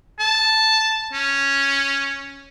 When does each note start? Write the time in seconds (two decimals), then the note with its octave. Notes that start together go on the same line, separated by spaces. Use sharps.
0.19 A5
1.13 C#4